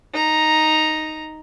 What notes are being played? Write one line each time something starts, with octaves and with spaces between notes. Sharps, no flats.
D#4 A#5